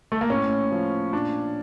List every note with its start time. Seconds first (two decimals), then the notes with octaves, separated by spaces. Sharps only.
0.12 A3
0.21 A#3
0.30 A2 C#4
0.72 F3
1.13 A#2 D4